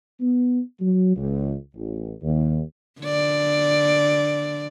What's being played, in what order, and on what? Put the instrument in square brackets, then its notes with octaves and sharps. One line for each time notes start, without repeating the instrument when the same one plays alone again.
[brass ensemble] B3
F#3
C#2
A1
D#2
[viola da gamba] D3 D5